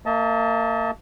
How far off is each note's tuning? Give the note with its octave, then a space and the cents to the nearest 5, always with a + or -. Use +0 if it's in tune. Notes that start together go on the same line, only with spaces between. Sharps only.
A#3 -30 D#5 +40 A5 +0